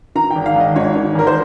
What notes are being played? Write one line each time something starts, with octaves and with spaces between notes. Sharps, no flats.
D#3 A#5
G#1 G5
F5
G#1
D#5
G#2 C#5
D#3
G#1 A#4
C5